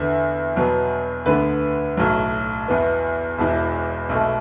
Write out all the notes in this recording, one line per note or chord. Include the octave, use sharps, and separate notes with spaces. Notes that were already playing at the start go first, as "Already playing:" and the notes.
Already playing: E2 D3 B3 E5
E2 B2 F#3 B3
D2 D3 B3 B4
B1 A2 F#3
E2 E3 B3
E1 E2 E3 A5
B1 B2 A3